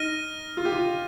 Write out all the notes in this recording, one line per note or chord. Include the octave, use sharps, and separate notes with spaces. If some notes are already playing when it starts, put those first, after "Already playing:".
Already playing: D#4 F6 A#6 D#7
F4
G4
F4